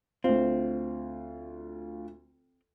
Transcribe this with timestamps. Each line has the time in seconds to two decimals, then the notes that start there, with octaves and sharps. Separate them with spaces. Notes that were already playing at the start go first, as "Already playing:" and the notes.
0.24 D2 C4 F4